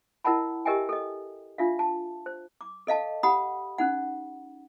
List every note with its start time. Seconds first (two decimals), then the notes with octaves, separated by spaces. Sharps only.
0.24 E4 A#4 D#5 F#5 A5 B5
0.65 G4 A#4 D#5 E5 G5 G#5
0.89 A4 D#5
1.58 D4 F4 E5 F5
1.79 A5
2.26 C5
2.61 D6
2.87 A4 D#5 F5 A5
3.23 G4 F#5 B5 D#6
3.78 C#4 D#4 F#5